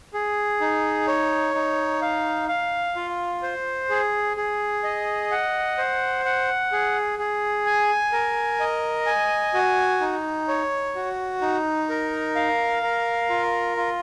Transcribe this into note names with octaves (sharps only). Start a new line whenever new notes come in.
G#4
D#4
C#5
D#4
F5
F5
F4
C5
G#4
G#4
D#5
F#5
C5
F#5
G#4
G#4
G#5
A#4
D#5
G#5
F#4
D#4
C#5
F#4
D#4
A#4
F5
A#4
F4
F4